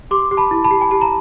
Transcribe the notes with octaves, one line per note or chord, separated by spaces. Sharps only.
G4 C6 D6
G4
A5 B5
E4
A5 B5
G4
G#5
G4 A5
A#5